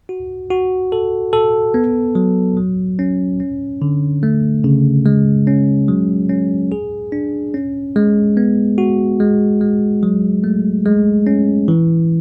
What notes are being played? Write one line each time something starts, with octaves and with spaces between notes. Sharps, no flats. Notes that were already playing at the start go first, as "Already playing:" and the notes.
F#4
F#4
A4
A4
B3
F#3
F#3
C#4
C#4
D3
A3
C#3
G#3
C#4
F#3
C#4
G#4
D4
C#4
G#3
B3
F#4
G#3
G#3
F#3
A3
G#3
C#4
E3